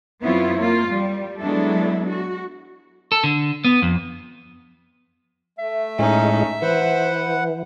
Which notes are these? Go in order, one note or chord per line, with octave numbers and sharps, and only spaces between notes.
F#2 B3 C4 E4 F4 C#5
A#3 F4
G3
F#3 G#3 B3 D4 E4 A4
F#4
A4
D3
B3
F2
A3 E5
A2 G#3 C#4 D#4
E3 B4 C5 F#5